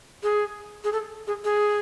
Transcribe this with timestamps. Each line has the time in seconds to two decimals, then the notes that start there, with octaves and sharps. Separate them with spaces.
0.23 G#4
0.84 G#4
0.93 A4
1.27 G#4
1.44 G#4